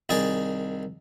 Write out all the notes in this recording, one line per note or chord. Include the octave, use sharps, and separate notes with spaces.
C2 D#3 G#4 D5 G#5